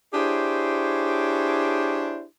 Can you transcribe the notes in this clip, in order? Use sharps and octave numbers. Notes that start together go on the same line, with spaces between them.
D4 E4 G4 G#4 C5 C#5